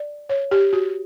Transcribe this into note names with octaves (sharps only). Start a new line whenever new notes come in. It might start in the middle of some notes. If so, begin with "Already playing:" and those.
Already playing: D5
C#5
G4
F#4